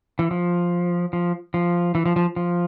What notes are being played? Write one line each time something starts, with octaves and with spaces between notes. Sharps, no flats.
E3
F3
F3
F3
E3
F3
F3
F3